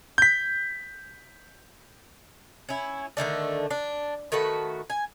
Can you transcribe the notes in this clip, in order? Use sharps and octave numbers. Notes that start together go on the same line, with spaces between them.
G6 B6
C#4 E4
D3 D#3 A3 D4
D4
D#3 A3 F#4 B4
G#5